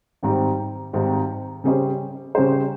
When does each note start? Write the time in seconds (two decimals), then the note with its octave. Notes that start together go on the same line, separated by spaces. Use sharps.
0.23 G#1 G#2 D#3 G3 C4
0.93 G#1 G#2 D#3 G3 C4
1.64 C#3 G3 C#4 G#4 C5
2.35 C#3 G3 C#4 G#4 C5